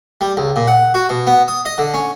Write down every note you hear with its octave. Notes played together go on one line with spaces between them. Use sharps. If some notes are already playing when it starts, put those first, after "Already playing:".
G3
C#2
A#2
F#5
F#4
B2
B3
D#6
D#5
D3
C#4